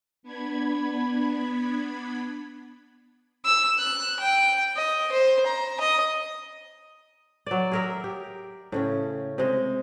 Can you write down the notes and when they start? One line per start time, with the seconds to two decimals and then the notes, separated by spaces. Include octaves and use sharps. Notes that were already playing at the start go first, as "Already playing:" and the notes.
0.23 B3 D4 B5 G#6
3.45 E6
3.79 F#6
4.20 G5
4.77 D#5
5.12 C5
5.46 A#5
5.80 D#5
7.46 F#3 D5
7.72 G#4 A#4 E5
8.04 G4
8.72 A2 C#3 C#4
9.38 C3 G#3